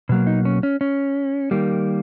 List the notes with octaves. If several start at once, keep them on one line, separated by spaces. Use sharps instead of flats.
B2 F#3 A#3
D#4
C#4
C#4
C#4
D#3 G3 A#3